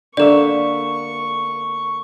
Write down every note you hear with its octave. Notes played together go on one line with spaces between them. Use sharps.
D3 A#3 A4 D5 E5 C#6